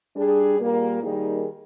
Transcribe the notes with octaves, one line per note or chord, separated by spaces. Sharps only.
G3 D4 G#4
A#2 G3 A#3
D#3 G3 A#3 D#4 G#4